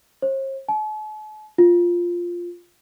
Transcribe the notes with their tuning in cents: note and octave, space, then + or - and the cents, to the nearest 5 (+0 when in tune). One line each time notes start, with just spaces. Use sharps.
C5 +45
A5 -45
F4 +0